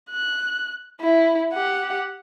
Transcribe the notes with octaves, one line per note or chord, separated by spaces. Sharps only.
F#6
E4
G4 F#5